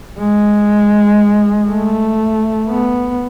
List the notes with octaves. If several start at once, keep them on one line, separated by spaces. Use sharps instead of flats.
G#3
A3
B3